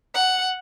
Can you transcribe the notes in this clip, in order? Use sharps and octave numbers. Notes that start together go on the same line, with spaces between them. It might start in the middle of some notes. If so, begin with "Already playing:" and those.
F#5